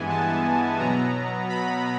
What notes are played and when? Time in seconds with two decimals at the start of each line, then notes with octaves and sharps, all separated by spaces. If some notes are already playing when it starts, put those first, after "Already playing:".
Already playing: G2 E3 G#3 B3 G#5
0.10 A5
0.80 B2 F#3 B3 A#5
1.50 B5